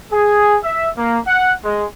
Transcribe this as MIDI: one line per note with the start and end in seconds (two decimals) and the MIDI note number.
0.12 0.57 68
0.63 0.88 76
0.98 1.19 58
1.26 1.53 78
1.64 1.85 56